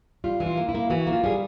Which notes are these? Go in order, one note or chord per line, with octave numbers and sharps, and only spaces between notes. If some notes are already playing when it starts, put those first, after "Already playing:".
G3 F4
E3
F4
A#3
E4
A#3
E3 F#4
A#3
F4
G3 G#4